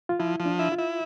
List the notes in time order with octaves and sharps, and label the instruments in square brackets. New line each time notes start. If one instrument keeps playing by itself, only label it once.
[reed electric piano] F4
[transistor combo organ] F3 [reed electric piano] E4
[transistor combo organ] F3
[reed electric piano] D4
[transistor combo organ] E4
[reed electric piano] F4
[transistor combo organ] E4